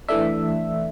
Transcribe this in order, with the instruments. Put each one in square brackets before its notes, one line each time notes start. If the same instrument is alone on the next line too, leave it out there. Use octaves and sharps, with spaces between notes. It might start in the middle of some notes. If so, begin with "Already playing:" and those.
[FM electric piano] E3 A3 D4 E5